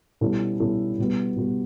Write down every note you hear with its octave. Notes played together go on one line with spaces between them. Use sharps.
B2 G3 C#4 E4 A4
B2 G3 C#4 E4 A4
B2 G3 B3 F#4
B2 G3 B3 F#4